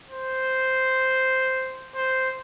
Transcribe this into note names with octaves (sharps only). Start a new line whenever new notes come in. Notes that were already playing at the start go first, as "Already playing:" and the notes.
C5
C5